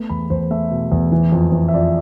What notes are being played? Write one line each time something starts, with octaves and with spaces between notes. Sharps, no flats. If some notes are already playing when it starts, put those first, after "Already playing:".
Already playing: A3 B3
E2 B5
E2 C5
A3 E5
B2
E2
E3
F2
E3
E5
F2 D5